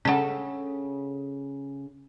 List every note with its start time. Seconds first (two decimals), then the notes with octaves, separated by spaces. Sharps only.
0.05 C#3 C#4 A4 F#5